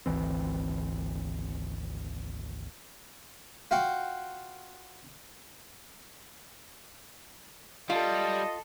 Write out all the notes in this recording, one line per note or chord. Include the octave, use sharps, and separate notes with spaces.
G#1 D2 E3 C4
F4 F#4 F#5 G5
G3 F4 A4 D#5